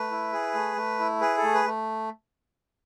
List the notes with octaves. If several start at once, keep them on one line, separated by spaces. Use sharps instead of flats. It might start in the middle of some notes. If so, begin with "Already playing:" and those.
Already playing: A3 B4
E4
G#4
A3
A3
E4
G#4 B4
A4
A3
B4
A3